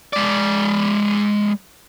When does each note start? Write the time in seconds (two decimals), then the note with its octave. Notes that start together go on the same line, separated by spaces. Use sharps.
0.13 G#3 D5